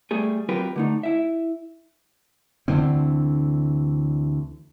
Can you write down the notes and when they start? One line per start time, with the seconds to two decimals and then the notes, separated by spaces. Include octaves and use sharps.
0.11 G3 A3 G#4
0.49 F#3 C4 F4 G4 A#4 B4
0.76 D3 A3 D#4
1.03 E4 E5
2.68 D2 D3 E3 C4